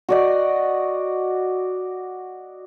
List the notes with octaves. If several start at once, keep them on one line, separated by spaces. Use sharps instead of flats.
F#4 D5 D#5